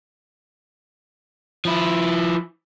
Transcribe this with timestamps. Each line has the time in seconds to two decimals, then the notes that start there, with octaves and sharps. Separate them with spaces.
1.65 F3 E4